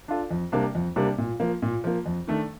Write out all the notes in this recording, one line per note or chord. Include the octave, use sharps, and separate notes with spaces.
D4 F4 A4
F2
C3 G3 A#3 D4
F2
C3 G3 A#3 D4
A#2
F3 A#3
A#2
F3 A#3
F2
D#3 A3 D4 A4